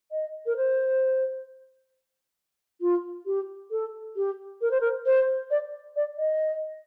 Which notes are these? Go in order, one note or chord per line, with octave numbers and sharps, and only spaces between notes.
D#5
A#4
C5
F4
G4
A4
G4
A#4
C5
A#4
C5
D5
D5
D#5